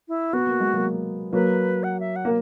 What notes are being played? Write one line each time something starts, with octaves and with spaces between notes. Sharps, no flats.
E4
B3 F#4
A#3
G#3
F#3 A#3
F#3 A#3 B4
F#5
E5
F#5
A#3